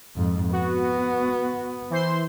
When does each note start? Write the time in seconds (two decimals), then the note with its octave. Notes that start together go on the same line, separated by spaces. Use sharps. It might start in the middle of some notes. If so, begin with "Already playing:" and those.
0.16 F2 G#2
0.52 B3 F#4
1.90 E3 C5 C6